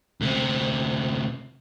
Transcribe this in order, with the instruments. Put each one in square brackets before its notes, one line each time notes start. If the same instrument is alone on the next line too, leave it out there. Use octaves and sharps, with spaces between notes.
[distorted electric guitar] D2 C3